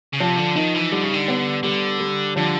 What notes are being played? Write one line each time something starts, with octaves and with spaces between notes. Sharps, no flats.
C#3
C3 F3
D3
D#3 D#4
E3
D3 G3
C#3
D3
B3
D3 G3
G3
D3 F3